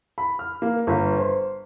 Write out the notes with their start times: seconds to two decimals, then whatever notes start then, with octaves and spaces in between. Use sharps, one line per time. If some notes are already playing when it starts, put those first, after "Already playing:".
0.18 B5
0.39 F6
0.62 A#3
0.87 G1
1.18 C5